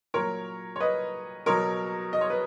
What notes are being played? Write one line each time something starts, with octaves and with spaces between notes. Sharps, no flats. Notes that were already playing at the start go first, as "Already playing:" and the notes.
A#2 F#3 A#4 C#5
C#5
B4 D#5
B2 F#3 A#4 C#5
D#5
C#5
B4